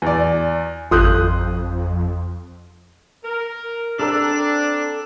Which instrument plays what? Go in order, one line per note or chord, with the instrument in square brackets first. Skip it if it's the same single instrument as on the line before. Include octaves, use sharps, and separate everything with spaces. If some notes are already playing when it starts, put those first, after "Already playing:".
[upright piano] E2 D5 [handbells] G#5
[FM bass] G#1 [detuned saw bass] F2 [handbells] F4 A4 G6 [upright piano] C6 D#6 F#6
[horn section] A#4
[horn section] C4 D4 [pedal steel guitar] A4 A#5 E6